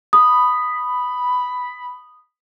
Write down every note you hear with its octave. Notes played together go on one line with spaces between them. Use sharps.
B5 D#6